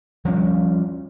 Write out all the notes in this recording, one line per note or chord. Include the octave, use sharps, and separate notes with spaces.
F3 G3 C#4